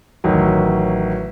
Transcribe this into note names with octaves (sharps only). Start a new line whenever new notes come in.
A1 D#3 F#3